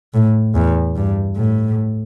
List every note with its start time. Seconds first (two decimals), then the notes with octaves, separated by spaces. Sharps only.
0.14 A2
0.55 E2
0.96 G2
1.36 A2